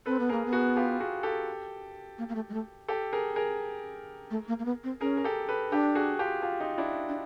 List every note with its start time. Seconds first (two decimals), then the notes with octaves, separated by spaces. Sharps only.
0.06 C4 A4 B4
0.20 B3
0.29 A#3 G#4 A#4
0.45 B3
0.53 F#4 G#4
0.76 F4 G4
1.00 F#4 G#4
1.23 G4 A4
2.18 A#3
2.29 A#3
2.35 A3
2.49 G#3
2.54 A3
2.88 G4 A4
3.13 G#4 A#4
3.36 G#4 A#4
4.31 A3
4.48 A#3
4.59 A#3
4.65 B3
4.84 C4
5.01 C#4 G#4 A#4
5.17 A#4
5.24 G4 A4
5.49 A4 B4
5.71 D4 G4 A4
5.95 F#4 G#4
6.19 F4 G4
6.42 F4 G4
6.60 D#4 F4
6.78 D4 E4
7.09 D4